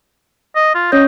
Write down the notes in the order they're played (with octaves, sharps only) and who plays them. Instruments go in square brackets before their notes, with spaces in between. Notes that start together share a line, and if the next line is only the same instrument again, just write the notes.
[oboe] D#5
F4
[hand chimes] C#4 C#5 G6 [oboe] D#5